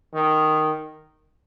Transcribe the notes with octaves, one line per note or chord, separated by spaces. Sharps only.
D#3